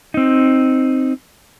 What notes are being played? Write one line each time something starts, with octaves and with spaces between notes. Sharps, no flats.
C4 D#4